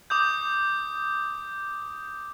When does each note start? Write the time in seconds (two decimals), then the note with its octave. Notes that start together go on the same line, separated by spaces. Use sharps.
0.10 D6 D#6 G6